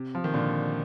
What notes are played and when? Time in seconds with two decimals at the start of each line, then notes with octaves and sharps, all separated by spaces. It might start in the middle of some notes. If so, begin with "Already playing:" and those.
Already playing: C3
0.15 F3
0.24 D#3
0.34 A#2 D3